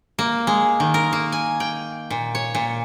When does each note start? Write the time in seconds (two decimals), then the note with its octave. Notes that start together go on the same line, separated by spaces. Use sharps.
0.19 A#3
0.47 G#3
0.80 D#3
0.94 A#4
1.13 A#3
1.32 G#5
1.60 G5
2.10 A#2
2.35 C#5
2.55 A#2